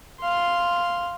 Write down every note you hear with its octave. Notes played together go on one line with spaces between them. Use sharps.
F5 C6